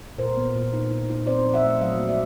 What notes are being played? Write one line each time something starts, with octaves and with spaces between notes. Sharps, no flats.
A#2 A#4 C5
B3
A#2
D#4
D#4
D#4
C4 C5 D5
F3
E5 F#5
A3
F#3 D#5 F5
A#3
D5 E5